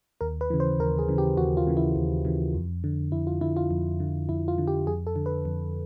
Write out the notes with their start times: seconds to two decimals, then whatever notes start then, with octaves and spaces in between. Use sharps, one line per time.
0.21 D#2 A#4
0.41 B4
0.50 C#3 E3
0.60 C5
0.79 D#2 A#4
0.99 G#4
1.09 C#3 E3
1.18 G4
1.37 D#2 F#4
1.57 F4
1.67 C#3 E3
1.77 E4
1.96 D#2
2.25 C#3 E3
2.55 F2
2.84 D3
3.12 F2 E4
3.27 F4
3.41 D3 E4
3.57 F4
3.71 F2
4.00 D3
4.29 F2 E4
4.48 F4
4.58 D3
4.68 G4
4.87 F2 G#4
5.07 A4
5.16 D3
5.26 B4
5.45 F2